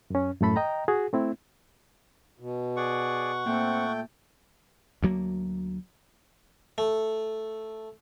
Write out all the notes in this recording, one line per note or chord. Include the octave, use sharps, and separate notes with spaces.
F#2 C#4
F#2 A2 A3 A4 B5
D#5 G5 A#5
F#4 G#4
A3 C4 E4
B2
G#4 D5 F#5 C#6
A#2 A3 C4 G5
D2 F#3 A#3
A3